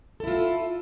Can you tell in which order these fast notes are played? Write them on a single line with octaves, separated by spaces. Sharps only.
A4 E4 F4